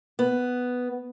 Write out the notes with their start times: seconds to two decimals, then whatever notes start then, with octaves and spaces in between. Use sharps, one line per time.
0.19 B3